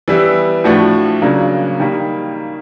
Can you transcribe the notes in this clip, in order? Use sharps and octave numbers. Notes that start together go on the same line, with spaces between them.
E3 G3 B3 E4
A2 F3 A3 D4 F#4
C#3 F#3 A#3 D4
D#3 G3 A#3